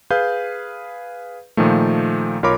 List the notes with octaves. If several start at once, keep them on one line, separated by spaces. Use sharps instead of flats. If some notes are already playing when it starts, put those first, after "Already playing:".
G#4 B4 F5 G6
A#2 D#3 F3 A3
B1 F4 A#4 C#5 B5 D6